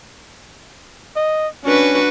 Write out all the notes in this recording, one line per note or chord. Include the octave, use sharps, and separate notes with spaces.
D#5
C#4 D4 F#4 B4